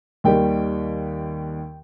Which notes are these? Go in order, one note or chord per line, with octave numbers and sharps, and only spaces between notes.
D#2 D#3 G3 G5